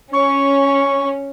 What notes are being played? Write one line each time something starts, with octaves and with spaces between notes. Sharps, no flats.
C#4 C#6